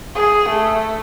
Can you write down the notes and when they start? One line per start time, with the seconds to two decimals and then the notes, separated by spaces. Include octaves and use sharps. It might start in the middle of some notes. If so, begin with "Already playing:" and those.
0.15 G#4
0.49 A3